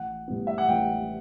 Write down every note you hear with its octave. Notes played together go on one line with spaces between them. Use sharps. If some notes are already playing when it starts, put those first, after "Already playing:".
Already playing: A1 F#5
A2 G3 B3
E5
F#5
A1 G5